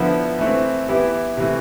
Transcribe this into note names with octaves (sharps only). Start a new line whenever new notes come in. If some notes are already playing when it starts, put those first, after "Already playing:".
Already playing: D3 F3 B3 E4
E3 A3 C4
E3 B3 E4 G4
C3 E3 A3